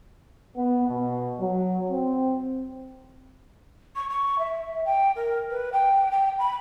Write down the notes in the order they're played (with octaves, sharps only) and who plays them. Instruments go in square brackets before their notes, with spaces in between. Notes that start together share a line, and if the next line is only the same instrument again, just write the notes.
[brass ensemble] B3
B2
F#3
C4
[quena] C#6
C#6
E5
G5
A#4
B4
G5
G5
B5